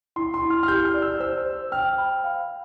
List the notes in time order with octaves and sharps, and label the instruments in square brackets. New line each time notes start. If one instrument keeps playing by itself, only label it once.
[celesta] E4 [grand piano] C6
[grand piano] C6
[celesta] E4
[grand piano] F6
F6
[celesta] G4 [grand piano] G6
[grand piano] F6
[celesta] D5
[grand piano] E6
[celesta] C5 [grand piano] E6
[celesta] C5
[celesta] G5 [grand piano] F6
[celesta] B5
F5